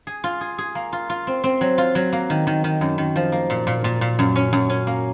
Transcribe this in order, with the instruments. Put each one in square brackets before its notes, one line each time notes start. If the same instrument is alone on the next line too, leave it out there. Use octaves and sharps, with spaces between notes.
[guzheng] G#4
F4
G#4
G#4
A#3
F4
F4
C4
C4
F#3
F4
F#3
A#3
D#3
D#3
D#3
F#2
D#3
F3
A#3
A#2
A#2
A#2
A#2
F#2
C#4
F#2
C#4
A#3